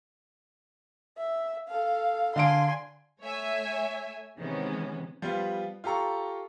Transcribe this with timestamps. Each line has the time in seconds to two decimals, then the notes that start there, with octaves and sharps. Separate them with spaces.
1.18 E5
1.68 A4 F5
2.36 D3 F5 G#5 C6 D7
3.21 A3 C#5 E5 G#5
4.38 C3 D#3 E3 G#3 B3 C#4
5.22 F3 G3 B3 F4
5.84 F4 G4 A4 A#5 C#6